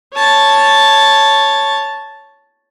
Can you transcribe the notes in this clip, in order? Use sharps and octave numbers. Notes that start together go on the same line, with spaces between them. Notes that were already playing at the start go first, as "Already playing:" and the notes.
C#5 A5